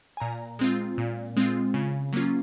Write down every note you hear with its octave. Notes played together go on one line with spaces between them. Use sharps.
G#5
A#2 A#5
G#3 C4 F4
A#2
G#3 C4 F4
C#3
F#3 A#3 C#4 F4